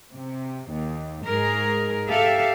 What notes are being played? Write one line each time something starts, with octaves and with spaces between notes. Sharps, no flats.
C3
D#2
G#2 G#4 A#4
G4 A4 E5 F5